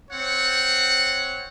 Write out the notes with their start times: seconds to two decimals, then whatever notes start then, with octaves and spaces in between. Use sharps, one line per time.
0.11 C4 C#5 F#5